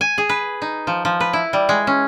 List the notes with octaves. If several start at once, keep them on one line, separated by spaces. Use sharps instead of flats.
G#5
G#4
B4
D#4
F3
F3
B4
E4
G3
G#3
C#4